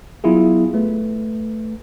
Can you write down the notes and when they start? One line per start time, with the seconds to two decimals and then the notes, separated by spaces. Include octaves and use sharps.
0.24 F#3 B3 E4 F4 G#4
0.74 A3 B4